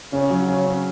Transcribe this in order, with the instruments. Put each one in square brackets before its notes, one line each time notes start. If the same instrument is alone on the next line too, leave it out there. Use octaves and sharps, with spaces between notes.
[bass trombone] C#3 [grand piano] C#4
[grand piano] F#3
[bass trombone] C#3 [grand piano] C#4
[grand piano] C#4